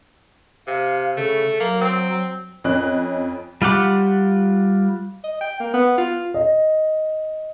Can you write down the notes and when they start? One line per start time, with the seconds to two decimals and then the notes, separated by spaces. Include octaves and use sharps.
0.67 C3 F5
1.17 C#3 A3
1.60 F#3 A#3
1.81 C4
2.64 F2 C#4 D#5 F#6
3.62 G3 F4 G4 F#5 D6
5.24 D#5
5.41 G5
5.60 A#3
5.74 B3
5.98 F4
6.34 D#5